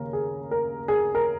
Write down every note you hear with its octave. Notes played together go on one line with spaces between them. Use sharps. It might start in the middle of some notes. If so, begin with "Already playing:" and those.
Already playing: D#2 C#3 A#4
G#4
A#4
G#4
A#4